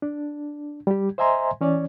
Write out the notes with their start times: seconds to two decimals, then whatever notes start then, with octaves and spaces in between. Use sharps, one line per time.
0.02 D4
0.87 G3 G4
1.18 C5 D#5 E5 G#5 A#5 C6
1.61 E3 C#4 C#5 D5